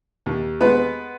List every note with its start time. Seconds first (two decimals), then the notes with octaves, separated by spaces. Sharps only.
0.26 D#2
0.60 G#3 B3 B4